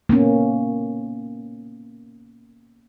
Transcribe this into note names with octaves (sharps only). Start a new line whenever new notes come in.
A#3 B3 C#4